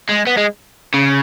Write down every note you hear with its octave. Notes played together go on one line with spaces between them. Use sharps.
G#3
B3
G#3
C#3